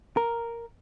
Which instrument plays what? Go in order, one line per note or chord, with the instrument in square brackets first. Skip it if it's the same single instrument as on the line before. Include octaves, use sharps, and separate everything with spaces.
[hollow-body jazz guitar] A#4